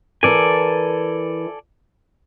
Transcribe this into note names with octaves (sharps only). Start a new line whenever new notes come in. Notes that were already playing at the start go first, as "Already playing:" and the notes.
E3 A4 A#4 D5 G#5